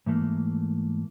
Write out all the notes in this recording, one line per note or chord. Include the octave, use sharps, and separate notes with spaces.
G#2 E3 A3 A#3